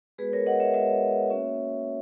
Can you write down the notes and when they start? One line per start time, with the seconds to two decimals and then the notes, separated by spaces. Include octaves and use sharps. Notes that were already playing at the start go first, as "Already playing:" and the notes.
0.18 G#3 B3 F#4 G#4 B4
0.33 A#4 C#5
0.46 D#5 F#5
0.60 C#5 E5
0.74 G#3 B3 F#4 C#5 E5
1.29 A#3 C#4 F#4